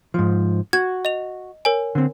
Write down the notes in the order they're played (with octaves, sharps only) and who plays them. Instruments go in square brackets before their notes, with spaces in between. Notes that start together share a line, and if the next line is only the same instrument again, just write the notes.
[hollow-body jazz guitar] G#2 F3
[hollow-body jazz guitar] F#4 [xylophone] G#6
[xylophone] D#5 F7
A#4 C#5 G#5
[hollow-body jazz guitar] D3 C4